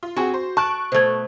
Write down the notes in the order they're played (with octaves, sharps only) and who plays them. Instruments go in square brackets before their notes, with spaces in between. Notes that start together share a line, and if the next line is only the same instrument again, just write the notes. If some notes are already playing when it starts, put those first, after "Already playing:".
[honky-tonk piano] F4
[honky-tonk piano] C4 G#4 F#5 [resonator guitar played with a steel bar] F#4
[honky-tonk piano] C5
[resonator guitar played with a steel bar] A5 [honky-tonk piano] C#6 F#6 D7
[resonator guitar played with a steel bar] B2 A3 [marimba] C5 G#6